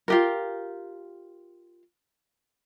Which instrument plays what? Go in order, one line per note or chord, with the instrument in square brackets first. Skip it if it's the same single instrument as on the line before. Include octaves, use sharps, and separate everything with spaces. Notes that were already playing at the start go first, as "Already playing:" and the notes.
[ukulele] F4 G4 A#4